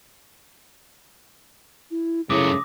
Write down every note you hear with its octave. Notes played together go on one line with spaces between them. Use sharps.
E4
F#2 C#3 A3 E4 D6 D#6 A#6